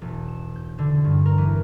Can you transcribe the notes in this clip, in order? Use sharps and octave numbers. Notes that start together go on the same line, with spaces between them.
E1
E7
G6
D3
G2
A#4
E3